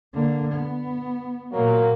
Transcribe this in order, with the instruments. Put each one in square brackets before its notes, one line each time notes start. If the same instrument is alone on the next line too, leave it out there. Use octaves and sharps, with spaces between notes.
[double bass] D3 A#3
B3
[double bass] A#2 [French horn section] F#3 A#3